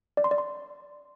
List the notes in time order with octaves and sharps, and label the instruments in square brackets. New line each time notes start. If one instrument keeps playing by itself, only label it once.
[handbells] D5
C6
D5
C6